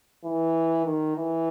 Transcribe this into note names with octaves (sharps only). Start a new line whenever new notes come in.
E3
D#3
E3